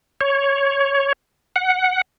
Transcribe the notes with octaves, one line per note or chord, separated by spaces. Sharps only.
C#5
F#5